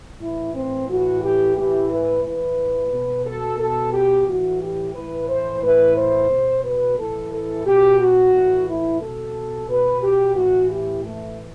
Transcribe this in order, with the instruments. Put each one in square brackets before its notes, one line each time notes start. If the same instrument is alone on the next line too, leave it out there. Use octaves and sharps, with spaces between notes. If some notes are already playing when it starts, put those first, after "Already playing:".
[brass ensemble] A2 E3 E4
C4
A2 E3 F#4
G4
A2 E3 G4
B4
A2 E3 B4
B2
A4
B2 A4
G4
A2 E3 F#4
G4
A2 E3 B4
C5
A2 E3 B4
C5
B2
B4
A2 E3 A4
A4
B2 G4
F#4
A2 E3
E4
B2 A4
B2 B4
G4
A2 E3 F#4
G4
A2 E3 A3